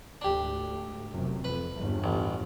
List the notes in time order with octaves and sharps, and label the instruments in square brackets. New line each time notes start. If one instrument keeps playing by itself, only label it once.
[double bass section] D2 G#2 [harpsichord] D4 G4
[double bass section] F1 F#2 C3
[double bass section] F2 [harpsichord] B4
[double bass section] G1 E2
[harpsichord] A1